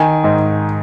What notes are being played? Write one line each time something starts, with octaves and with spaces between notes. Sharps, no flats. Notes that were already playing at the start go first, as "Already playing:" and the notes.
Already playing: D#3 G#5
G#2